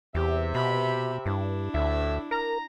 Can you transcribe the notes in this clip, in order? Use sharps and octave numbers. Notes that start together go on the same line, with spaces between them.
E2 C3 G4 E5
B2 G4 B5
G2 D4 E4
D2 A2 E5
A#4 A#5